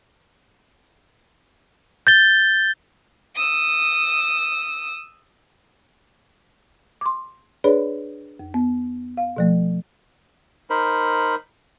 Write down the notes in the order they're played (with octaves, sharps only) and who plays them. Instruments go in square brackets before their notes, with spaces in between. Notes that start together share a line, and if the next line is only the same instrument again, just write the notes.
[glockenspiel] G6 A6 G7
[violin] D#6 E6
[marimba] C6 D6
D4 G#4 B4 C#5 D5 B5
F2
B3
F5
B2 F3 A3
[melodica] D#4 A#4 C5 B5